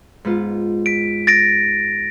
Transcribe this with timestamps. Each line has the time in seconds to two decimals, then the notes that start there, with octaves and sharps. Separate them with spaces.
0.25 G#2 B3 F4
0.86 B6 D7
1.27 A6 A#6 D7